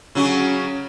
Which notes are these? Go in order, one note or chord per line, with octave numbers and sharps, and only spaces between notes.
C#3 F#3 C#4